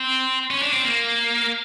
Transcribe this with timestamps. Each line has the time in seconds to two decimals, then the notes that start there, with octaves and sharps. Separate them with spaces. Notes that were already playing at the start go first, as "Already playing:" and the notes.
Already playing: C4
0.51 C#4
0.62 D4
0.73 C4
0.85 A#3